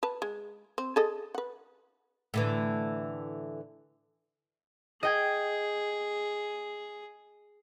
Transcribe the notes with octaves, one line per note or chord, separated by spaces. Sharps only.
B4 A5
G#3
C4
G#4 A4 D#5
B4 F#5
A2 D3 E3
G#4 D#5 G5 G#6